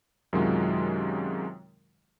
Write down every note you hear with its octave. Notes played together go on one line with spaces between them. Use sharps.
F#2 C3 D#3 F#3 G#3 F4